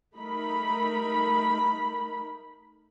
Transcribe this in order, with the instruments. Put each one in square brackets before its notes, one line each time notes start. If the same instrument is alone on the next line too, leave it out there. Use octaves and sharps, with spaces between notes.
[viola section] A3 D#4 A#4 B5